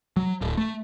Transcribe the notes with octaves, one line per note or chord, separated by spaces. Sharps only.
F#3
D1
A3